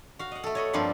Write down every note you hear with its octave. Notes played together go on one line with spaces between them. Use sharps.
F#4 F5
D#5 F#5
A3 A4
C#5 D#5 B5
G2 F3 A#3 C4 D4 B5